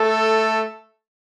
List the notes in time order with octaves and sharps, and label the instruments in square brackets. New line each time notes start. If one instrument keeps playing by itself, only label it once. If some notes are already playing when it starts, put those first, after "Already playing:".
Already playing: [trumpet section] A3 A4